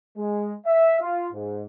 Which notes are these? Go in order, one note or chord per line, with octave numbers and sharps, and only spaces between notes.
G#3
E5
F4
G#2